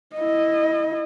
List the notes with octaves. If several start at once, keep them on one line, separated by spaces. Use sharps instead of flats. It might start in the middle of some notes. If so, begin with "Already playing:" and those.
E4 D#5